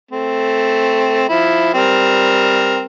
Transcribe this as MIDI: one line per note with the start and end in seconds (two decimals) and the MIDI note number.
0.11 1.25 57
0.11 1.25 60
1.29 1.72 53
1.29 1.72 64
1.74 2.86 55
1.74 2.86 60
1.74 2.86 70